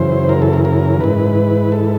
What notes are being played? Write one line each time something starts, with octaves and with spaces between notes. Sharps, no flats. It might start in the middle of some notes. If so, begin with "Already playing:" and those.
Already playing: F#2 C#3 E3 C5
A#4
A4
A#4
A#4
G#2 E3 B4
A4